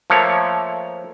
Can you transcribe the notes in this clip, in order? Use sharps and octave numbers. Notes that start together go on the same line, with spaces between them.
F3 A3 A#3 C#5